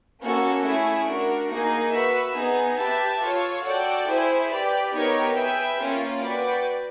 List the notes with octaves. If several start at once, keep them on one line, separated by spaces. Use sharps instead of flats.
A#3 C#4 F#4 A4
A3 C#4 E4 G#4
D4 F#4 A#4
A#3 D#4 G#4
F#4 B4 E5
B3 D#4 G#4
G4 B4 E5 A5
F4 A4 C#5
F#4 A4 D5 G5
E4 G#4 C5
G4 B4 D5
B3 D#4 G4 A#4 C#5
G#4 B4 E5 G5
A#3 C#4 F4
F#4 B4 D5 G5